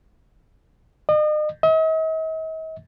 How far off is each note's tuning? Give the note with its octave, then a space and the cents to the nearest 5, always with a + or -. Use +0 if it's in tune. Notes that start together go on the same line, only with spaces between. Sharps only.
D#5 -40
D#5 +45